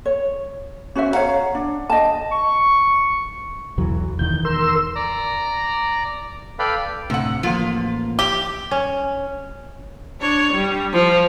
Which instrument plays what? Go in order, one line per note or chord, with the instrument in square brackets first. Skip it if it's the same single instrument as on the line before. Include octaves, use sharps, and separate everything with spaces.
[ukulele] C#5
C#4 F#4 C5 E5
C#5 F5 F#5 A#5
D4
D#5 A5
[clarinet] C#6
[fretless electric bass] B1 E3 F#3 [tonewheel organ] E2
[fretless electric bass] E1 E2 D#3 [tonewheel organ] G6
[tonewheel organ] A#4 C6 E6
[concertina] D5 A#5
A4 B4 D5 F5 G5 B5
[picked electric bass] D2 A2 [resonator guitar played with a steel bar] C3 F#5
[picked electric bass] A1 A#3 [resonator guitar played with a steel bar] F3 F4
[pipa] G4
[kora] C#4
[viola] D4 C#5
G3
F3